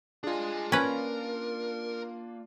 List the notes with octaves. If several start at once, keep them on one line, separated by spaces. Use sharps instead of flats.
D4 F4 G#4 D#5
A#3 C#4 A#4 B4